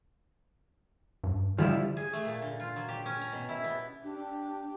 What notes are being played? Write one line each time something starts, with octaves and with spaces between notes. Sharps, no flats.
G2
D3 F3 G3 E4
G#4
A3
A#2
D3
F4
F#3
G4
C#4
A#5
B2
E4
B3
D4 G4